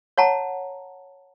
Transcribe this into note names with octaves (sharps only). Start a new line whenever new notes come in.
C#5 F#5 A5 A#5